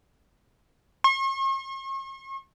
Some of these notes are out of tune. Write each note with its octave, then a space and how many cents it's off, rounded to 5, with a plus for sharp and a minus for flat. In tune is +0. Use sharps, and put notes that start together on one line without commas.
C#6 -45